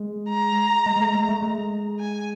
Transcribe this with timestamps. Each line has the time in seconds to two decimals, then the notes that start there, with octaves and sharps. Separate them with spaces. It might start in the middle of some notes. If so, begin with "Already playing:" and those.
Already playing: G#3
0.29 A#5
0.86 G#3
0.96 G#3
1.00 A3
1.15 G#3
1.29 A3
1.43 G#3
2.00 G#5